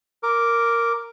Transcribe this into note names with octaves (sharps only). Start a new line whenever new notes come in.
A#4 D6